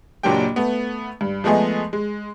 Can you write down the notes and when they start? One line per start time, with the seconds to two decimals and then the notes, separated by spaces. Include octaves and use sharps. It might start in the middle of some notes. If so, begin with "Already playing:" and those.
0.23 F#1 A#2 F#3 D4 G4 G5
0.56 A3 B3
1.21 G2
1.44 F3 G#3 A3 B3 G#4 D#5
1.93 G#3